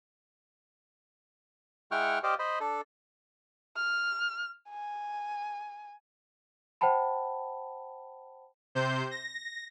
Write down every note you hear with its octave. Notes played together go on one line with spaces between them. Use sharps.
G#3 E4 F#5 G5 C#6 F6
G4 C5 D5 D#5 F5
C5 D#5 B5
D4 A4
F6
G#5
C5 F#5 G5 A5 B5
C3 C5 G6
A#6